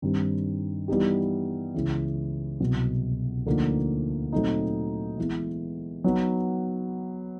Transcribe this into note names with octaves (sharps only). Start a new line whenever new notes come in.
G2 D#3 G3 C4 D#4
E3 G3 B3 D#4 G4
C#2 C#3 E3
C2 B2 F#3
D2 D3 F3 A#3 D#4
A#2 F#3 A3 C4 D#4
E3 G#3 B3
F#3 B3 D#4